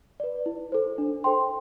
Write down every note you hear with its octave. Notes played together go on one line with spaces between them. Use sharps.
B4 D5
E4
A4 C5
D4
A4 C5 G5 C6